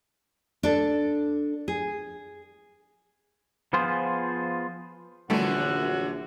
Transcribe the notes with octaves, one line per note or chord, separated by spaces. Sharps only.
D4 A4
G#4
F3 B3 F4 G#4 C5
A#1 F#2 D3 E3 G3 A3 E4 F#4